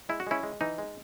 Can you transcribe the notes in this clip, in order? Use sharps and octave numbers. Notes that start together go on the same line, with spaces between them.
G#3 E4
F#4
G#3 C#4 E4
G#3
E3 D#4
G#3